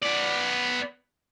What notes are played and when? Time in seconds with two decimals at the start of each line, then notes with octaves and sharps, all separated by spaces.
0.02 B3 D5